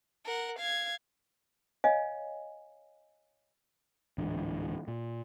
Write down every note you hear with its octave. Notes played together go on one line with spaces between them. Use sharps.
A#4 F#5
F5 G#6
C#5 D#5 F5 G#5
D1 G#2 E3 D4
A#2